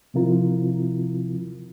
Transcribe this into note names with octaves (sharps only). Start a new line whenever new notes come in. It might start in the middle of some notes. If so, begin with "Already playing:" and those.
C3 F3 C4 E4 F4 A#4